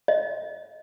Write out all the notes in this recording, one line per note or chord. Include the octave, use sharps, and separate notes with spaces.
D#5